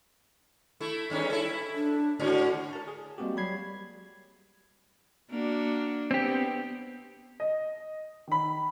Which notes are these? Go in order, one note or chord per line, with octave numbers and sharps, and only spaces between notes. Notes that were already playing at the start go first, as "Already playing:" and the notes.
A3 E4
E2 G2 C#4
E4 A4
D4
G#2 D3 C#4 F#4
A#4 A5
G#4
G3 G#3 A#3 C4 F#4 G4
F#3 G3 B5 G#6 C7
A#3 D4 F#4
B3 C4 G4
D#5
D#3 B5